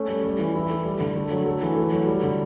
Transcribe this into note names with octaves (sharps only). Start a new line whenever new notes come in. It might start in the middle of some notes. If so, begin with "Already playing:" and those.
Already playing: A3 C#4
G3
G3
E3
E4
A3
G3
D3
A3
F#3
A3
E3
A3
F#3
G3
D3